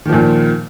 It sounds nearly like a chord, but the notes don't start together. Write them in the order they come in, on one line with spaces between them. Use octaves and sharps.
D#3 F3 A#2